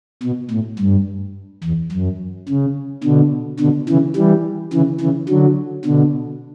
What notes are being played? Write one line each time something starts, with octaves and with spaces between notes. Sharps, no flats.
B2
A2
G2
E2
F#2
C#3
B2 D3
B2 D3
C#3 E3
E3 G3
C#3 E3
C#3 E3
D3 F#3
B2 D3